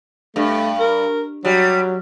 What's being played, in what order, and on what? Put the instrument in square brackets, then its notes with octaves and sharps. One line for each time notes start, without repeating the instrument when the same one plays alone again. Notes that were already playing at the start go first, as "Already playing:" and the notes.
[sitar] G2 [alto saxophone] A3
[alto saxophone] A#4
[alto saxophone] F#3 [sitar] G3